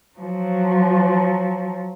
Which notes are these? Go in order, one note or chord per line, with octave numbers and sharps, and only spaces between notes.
F3 F#3